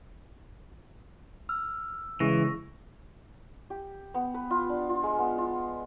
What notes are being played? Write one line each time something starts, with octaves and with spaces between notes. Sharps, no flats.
E6 F6
C#3 E3 G#3 C#6 A#6
G4
B3
B4
F4
D4
F4
G#3
B3
F4